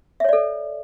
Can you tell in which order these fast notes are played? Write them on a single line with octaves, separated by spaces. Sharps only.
E5 C#5 D5 A4